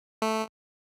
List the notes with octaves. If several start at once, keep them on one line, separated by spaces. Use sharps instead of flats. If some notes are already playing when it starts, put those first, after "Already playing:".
A3